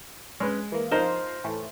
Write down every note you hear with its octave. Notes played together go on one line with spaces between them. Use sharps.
G#3 C#4 B4
E3 A#3
F3 D#4 F4 A#4 C5 C7
A2 E3 A3